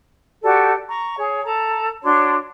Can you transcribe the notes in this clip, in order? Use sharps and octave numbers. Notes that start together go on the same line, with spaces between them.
F#4 G4 A4 D5
A#5 C#6
G#4 C#5
A4 A#5
D4 F#4 C#5 C6